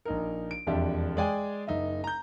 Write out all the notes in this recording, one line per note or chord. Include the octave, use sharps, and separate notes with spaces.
A#1 D#4 A#4
D7
E1 F2 D4 G4 E5
G#3 G#4 D5 G5 G#5
F#1 D#4 E5
A#5 G6